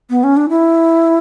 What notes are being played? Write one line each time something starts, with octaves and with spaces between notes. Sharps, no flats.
B3
C#4
D4
E4